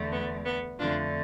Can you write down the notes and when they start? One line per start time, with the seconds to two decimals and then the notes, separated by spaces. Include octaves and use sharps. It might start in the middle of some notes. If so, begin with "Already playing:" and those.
Already playing: E2 D3 A3
0.12 B3
0.45 B3
0.78 F2 D3 A3 D4 F4